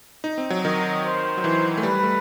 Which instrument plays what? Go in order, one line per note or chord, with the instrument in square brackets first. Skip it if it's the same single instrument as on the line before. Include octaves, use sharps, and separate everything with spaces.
[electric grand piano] D#4
C4
F#3
[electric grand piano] D#3 [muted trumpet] D#5
[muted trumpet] C5
[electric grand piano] F#3
E3
A3
[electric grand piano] G3 [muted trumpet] B4
[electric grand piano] A3